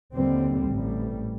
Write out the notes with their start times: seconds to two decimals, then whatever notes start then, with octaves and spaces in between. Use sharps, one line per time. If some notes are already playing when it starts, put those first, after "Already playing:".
0.14 D#2 D3 G3 C4
0.71 A1 A2 G3